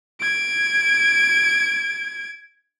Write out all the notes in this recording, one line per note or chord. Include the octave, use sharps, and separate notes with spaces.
G#6 D7